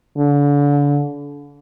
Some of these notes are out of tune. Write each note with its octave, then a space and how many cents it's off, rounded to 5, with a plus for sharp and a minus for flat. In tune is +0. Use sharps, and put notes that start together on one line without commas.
D3 -35